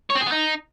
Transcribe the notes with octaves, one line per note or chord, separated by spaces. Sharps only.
C#5
C4
G#4
B3
D#4